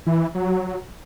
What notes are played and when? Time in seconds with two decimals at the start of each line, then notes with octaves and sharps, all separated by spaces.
0.06 E3
0.35 F#3